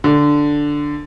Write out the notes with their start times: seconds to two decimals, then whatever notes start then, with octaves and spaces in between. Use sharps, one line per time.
0.04 D3